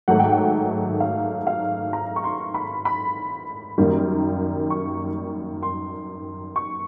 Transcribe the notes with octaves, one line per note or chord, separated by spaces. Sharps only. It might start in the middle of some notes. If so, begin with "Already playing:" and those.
G#2 D#3 F#3 A3 F#5
G5
F#5
F5
F5
A#5
C#6
C6
B5
B5
F#2 D#3 G3 A#3
C#6
C6
C#6